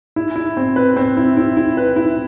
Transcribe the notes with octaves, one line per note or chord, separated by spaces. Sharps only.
E4
E4
C4
B4
C4
E4
E4
E4
B4
E4